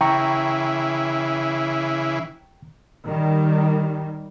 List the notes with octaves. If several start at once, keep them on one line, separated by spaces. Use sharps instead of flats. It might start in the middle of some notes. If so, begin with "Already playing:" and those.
C#3 E3 E4 G5 A#5 C#6
D#3 G3